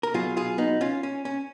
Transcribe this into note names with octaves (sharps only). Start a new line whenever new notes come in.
A#4
B2 F#3 F4 G#4
F4 G#4
B3 D#4
C#4 F4
C#4
C#4